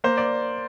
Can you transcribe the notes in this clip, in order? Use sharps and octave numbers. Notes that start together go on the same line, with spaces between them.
A#3 C5
D5